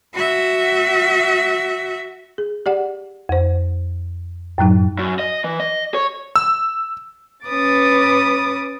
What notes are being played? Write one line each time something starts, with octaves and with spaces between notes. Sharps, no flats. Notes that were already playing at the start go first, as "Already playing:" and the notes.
F#4 E5
G#4
G4 D5 F#5
F2 C5
F#2 A2 F#3 D#4
F#2
D#5
E3
D#5
C#5
E6
C#4 B4 D6 D#6 A6